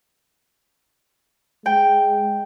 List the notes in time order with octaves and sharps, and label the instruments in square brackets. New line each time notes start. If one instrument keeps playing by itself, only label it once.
[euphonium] G#3 [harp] G5